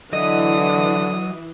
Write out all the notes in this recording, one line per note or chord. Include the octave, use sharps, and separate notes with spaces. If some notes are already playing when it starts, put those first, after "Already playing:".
D3 E3 F#3 D#5 D#6